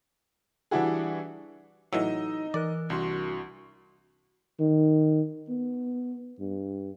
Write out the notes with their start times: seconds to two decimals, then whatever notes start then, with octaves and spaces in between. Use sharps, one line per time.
0.71 E3 G3 D4 E4 F#4 G#4
1.93 A2 E3 F#3 D#4 D#5 E6
2.54 E3 A#4 D5 F#6
2.90 C2 D4 F#4 C6
4.60 D#3
5.49 B3
6.40 G2